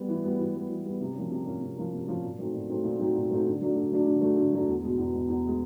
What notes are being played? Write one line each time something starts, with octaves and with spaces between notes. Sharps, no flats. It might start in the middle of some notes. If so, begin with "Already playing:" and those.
Already playing: G3 B3
E3
G3 B3
E3
G3 B3
E3
G3 B3
C3
F3 A#3 C#4
C3
F3 A#3 C#4
C3
F3 A#3 C#4
C3
F3 A#3 C#4
A#2
F#3 A3 C4 D#4
A#2
F#3 A3 C4 D#4
A#2
F#3 A3 C4 D#4
A#2
F#3 A3 C4 D#4
D3
F#3 A3 D4
D3
F#3 A3 D4
D3
F#3 A3 D4
D3
F#3 A3 D4
E2
B2 G#3
E2
B2 G#3
E2
B2 G#3